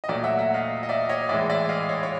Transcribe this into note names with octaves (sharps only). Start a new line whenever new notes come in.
D#5
A#2 F#3 A3 D5 E5
E5 F#5
E5 F#5
D#5 F5
D#5
D5 E5
C#5 D#5
A2 E3 G#3 D5 E5
D5 E5
D#5 F5
C#5 D#5
C#5